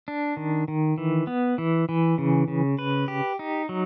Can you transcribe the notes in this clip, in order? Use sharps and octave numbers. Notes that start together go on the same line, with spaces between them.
D4
D#3
D#3
E3
B3
E3
E3
C#3
C#3
B4
G4
D#4
F#3